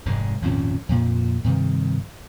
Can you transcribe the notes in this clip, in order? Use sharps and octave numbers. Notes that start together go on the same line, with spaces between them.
F1 G#2 G#3
G#1 F2 A#2 C#4
F2 A#2
G2 C3 D#3